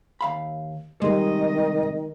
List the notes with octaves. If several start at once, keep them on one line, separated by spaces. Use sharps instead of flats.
D#2 F5 B5
C2 D#3 G3 G#3 G4 D#5